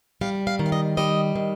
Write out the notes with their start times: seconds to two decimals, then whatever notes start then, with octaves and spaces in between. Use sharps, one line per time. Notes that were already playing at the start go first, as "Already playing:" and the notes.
0.21 G3 F5
0.47 F5
0.59 D#3
0.66 F5
0.72 D#5
0.97 G3 D#5
1.36 D#3